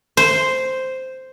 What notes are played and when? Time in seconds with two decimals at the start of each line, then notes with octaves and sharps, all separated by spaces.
0.17 C5